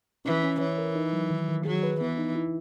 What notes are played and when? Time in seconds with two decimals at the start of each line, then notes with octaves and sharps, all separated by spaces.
0.25 E3 C#4
0.43 C#4
0.60 E3 C#5
0.78 A#4
0.96 D#4
1.13 F#3
1.30 D#3
1.49 D#3
1.65 F#3 G#4
1.83 B4
2.01 E3 B3
2.18 D#4
2.35 E4